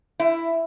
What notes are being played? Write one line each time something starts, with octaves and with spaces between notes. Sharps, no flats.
E4